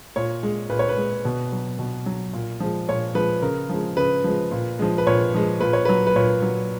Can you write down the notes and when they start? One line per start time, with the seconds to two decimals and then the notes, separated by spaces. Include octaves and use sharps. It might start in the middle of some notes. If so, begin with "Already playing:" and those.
0.16 A#2 C#5
0.43 G#3
0.70 A#2 B4
0.79 C#5
0.89 B4
0.97 G#3
1.25 B2
1.52 F#3
1.79 B2
2.06 F#3
2.33 A#2
2.60 F3 G#3
2.88 A#2 C#5
3.15 F3 G#3 B4
3.42 C#3 A#4
3.69 F3 G#3
3.97 C#3 B4
4.24 F3 G#3
4.51 A#2
4.79 F3 G#3
4.98 B4
5.07 A#2 C#5
5.34 F3 G#3
5.60 A#2 B4
5.73 C#5
5.85 F#3 B4
6.07 B4
6.16 A#2 C#5
6.42 F#3